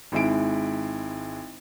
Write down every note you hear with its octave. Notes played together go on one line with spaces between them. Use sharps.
G#1 G#3 E4 D7